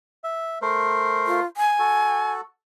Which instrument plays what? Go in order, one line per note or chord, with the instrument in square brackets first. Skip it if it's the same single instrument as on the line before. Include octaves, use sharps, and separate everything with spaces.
[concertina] E5
A3 A#4 C5
[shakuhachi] F4
G#5
[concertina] F#4 A4